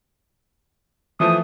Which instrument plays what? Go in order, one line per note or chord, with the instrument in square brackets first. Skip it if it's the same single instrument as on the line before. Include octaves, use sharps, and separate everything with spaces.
[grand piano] E3 F3 A3 [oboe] D#6